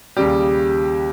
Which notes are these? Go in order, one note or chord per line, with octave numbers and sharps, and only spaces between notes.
D#2 C#3 G3 G4